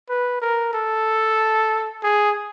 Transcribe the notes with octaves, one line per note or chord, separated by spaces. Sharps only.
B4
A#4
A4
G#4